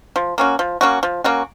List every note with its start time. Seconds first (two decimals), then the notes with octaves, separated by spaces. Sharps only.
0.16 F3
0.38 A#3 C#4 F#4
0.59 F3
0.81 A#3 C#4 F#4
1.03 F3
1.24 A#3 C#4 F#4